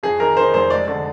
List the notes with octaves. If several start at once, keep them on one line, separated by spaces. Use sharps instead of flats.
F2 G#4
D#3 A#4
D#3 C5
F1 C5
G#3 D5
D3